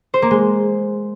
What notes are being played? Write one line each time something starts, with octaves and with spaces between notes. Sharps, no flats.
C5
A#3
G#3